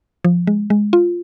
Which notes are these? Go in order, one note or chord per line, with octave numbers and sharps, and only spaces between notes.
F3
G#3
G#3
F4